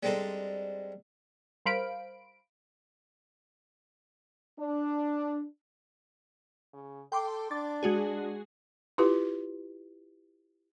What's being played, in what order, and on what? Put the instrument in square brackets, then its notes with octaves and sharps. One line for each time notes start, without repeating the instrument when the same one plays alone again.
[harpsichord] G3 G#3 C4 D4 D#4 A4
[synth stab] G3 A#4 C5 F5 B5 D7
[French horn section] D4
[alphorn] C#3
[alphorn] A4 [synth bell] G5 C6 D6
[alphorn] D4 [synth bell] D6 A6
[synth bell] G#3 F#4 G#4
[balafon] E4 F4 G4 B4